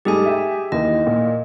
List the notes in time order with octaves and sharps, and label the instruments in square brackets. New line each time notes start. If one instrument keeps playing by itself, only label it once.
[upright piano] G#2 G3 A3 [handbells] G4 G#4 G#5
[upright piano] E5 G5
[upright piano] D#2 E3 [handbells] D#5
[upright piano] A#2